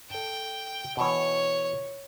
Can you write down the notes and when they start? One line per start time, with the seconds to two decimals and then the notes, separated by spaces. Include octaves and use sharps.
0.10 A4 G5 A5
0.97 B2 E3 C#5